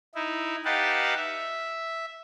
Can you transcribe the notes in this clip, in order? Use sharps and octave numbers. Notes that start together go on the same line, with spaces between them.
D#4 E4
D#4 G4 B4 F5 F#5 A5
E5